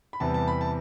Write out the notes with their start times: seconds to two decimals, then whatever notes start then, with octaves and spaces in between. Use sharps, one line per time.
0.13 B5
0.20 E2 C3 E3 G3 A5
0.34 A5
0.48 B5
0.61 A5